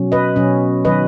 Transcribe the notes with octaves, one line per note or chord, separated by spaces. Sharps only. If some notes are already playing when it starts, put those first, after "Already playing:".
Already playing: B2 F#3 C#4
B4 D#5
B2 F#3 C#4
D#3 F#3 B3 B4 D#5